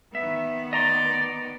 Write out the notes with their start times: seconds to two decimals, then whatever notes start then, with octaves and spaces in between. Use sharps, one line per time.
0.15 D#3 B3 E5
0.73 D5 D#5 A#5 C6